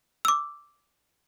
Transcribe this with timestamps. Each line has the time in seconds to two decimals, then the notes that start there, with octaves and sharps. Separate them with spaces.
0.25 D6 E6